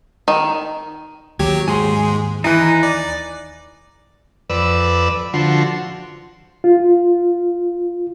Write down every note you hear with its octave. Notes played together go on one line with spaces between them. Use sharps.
D#3
D#2 F#3 G4 G#6
G#2 G#3 G#5 C6
E3 D#4 E4 G#5 F#6
D5
F2 B4 D5 E6
D3 F3 F#4 C6
F4